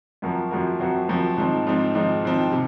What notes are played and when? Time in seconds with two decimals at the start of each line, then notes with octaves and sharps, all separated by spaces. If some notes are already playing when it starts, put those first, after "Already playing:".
0.22 F#2 F3 C4 F#4 A#4
0.51 F#2 F3 C4 F#4 A#4
0.80 F#2 F3 C4 F#4 A#4
1.08 F#2 F3 C4 F#4 A#4
1.37 G#2 F3 C4 D#4
1.67 G#2 F3 C4 D#4
1.95 G#2 F3 C4 D#4
2.24 G#2 F3 C4 D#4
2.52 C3